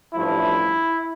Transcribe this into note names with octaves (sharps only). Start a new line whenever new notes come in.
A1 G2 F3 A3 E4